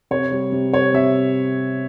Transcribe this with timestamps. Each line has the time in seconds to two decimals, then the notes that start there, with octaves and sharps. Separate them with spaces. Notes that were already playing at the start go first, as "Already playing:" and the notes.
0.11 C3 C#5
0.31 G3
0.52 C3
0.73 C4 C#5
0.93 C3 E5